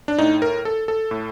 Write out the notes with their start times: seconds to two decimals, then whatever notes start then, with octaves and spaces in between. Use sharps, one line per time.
0.08 D4
0.19 A2 D#4
0.42 A#4
0.65 A4
0.88 A4
1.11 A2